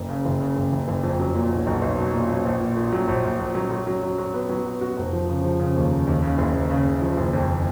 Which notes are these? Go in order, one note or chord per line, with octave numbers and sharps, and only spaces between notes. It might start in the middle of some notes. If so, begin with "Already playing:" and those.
Already playing: F#1
C#3
F#1
C#3
F#1
F#1
F#1
F2
F#3
A#2
B1
B1
B1
F#3
A#2
F#3
A#1
A#2
A#2
F#3
A#1
A#1
A#1
F#3
F#3
F#3
F#3
F#3
B3
F#3
B3
F#4
F1
F3
C#3
F3
C#3
D#2
C#3
D#2
C#3
F#1
F#1
C#3
C#3
F3
F#1
F2